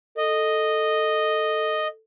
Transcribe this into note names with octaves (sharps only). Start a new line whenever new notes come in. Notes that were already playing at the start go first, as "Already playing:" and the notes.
A4 D#5